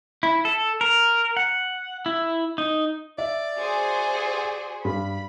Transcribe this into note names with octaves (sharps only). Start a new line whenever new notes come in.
E4
A4
A#4
F#5
E4
D#4
D5 E5
F#4 G#4 C5
G2 B5